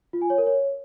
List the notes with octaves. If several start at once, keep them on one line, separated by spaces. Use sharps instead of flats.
F4
G#5
C#5
A#4
C#5